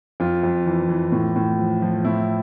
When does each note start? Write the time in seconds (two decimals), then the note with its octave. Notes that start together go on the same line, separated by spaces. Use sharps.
0.20 F2 F4
0.43 F2
0.66 E3
0.89 E3
1.12 A2
1.36 A2
1.58 F3
1.82 F3
2.05 A2 E4